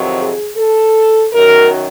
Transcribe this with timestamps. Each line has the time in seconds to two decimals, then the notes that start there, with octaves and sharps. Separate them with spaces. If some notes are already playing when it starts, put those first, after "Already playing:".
Already playing: F2 C3 D#3 F#3
0.18 G#4
0.56 A4
1.33 F#2 D#3 F#3 A#4